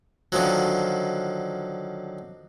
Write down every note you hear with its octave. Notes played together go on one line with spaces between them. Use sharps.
D3 D#3 F3 F#3